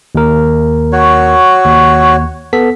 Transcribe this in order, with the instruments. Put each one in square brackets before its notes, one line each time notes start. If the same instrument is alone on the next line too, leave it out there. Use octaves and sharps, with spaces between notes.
[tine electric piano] D#2 A#4
[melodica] F#4 C#5
[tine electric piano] D#2
B3 A4 B6